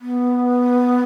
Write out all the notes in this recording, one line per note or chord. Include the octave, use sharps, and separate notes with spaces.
B3